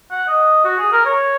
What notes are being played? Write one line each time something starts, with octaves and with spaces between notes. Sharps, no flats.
F#5
D#5
F#4
G#4
A#4
C#5